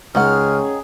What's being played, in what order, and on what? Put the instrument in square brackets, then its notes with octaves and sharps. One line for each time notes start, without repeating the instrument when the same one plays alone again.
[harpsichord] C#2 [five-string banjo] D#3 F#5 [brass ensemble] C#4 G#4 [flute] F6